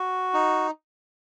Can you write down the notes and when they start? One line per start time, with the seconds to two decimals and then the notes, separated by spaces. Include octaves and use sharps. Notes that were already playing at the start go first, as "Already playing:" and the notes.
Already playing: F#4
0.34 D#4